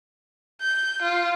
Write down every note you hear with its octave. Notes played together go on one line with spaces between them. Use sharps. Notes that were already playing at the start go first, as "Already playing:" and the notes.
G6
F4